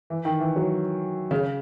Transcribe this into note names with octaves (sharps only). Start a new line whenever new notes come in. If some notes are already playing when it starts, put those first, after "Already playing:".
E3
D#3
E3
F#3
C#3